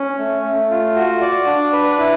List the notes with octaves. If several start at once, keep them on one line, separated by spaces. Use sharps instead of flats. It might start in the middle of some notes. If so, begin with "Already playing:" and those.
Already playing: C#4
A3
A3
F4
F#4
D5
D4
B4
E4